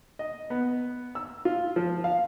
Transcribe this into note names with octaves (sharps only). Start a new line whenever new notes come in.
D#5
B3
E6
F4
F3
F5